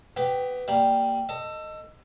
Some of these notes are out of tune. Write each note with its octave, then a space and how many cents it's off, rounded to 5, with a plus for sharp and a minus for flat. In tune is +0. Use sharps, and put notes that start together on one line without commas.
B3 +20 G4 +0
G3 +0 A#3 -15
A4 +20 D#5 +0